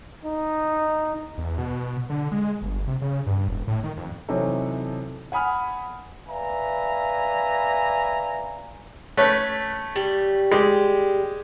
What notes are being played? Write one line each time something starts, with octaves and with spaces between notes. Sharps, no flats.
D#4
E2
B2
D3
G#3
G1
C3
C#3
G2
E1
A2
D#3
F2
C3 E3 F#3 C#4 D#4 A4
F#5 G#5 B5 D#6 F6
B4 D5 E5 F5 G#5 A#5
A3 C#4 B4
G3
G#3 G4